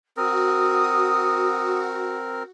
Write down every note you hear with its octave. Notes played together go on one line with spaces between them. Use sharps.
C4 F#4 A#4 D#6